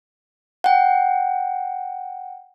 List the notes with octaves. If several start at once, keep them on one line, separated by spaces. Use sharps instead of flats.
F#5 G5